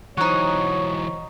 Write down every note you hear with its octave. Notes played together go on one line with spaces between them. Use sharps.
E3 F#3 D#4 C5 C#5 F#5 C#6